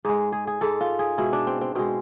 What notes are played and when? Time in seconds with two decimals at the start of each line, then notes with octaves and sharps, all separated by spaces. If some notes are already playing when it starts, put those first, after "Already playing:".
0.05 G#2 G#3 G#4
0.32 G#4
0.47 G#4
0.61 G#2 G#3 A4
0.81 F4
0.99 G#4
1.18 B2 G#3 E4
1.33 D4
1.47 C4
1.61 C4
1.75 B2 G#3 C4